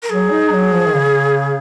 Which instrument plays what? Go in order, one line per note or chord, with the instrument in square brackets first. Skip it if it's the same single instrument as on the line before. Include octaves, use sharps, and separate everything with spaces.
[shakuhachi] A#4
[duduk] F#3 [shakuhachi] G#4
[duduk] D#4
F#3
F3
D#3
C#3